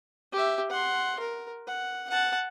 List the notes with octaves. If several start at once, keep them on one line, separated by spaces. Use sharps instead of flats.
G4 E5
F#5 C6
A#4
F#5
F#5 A5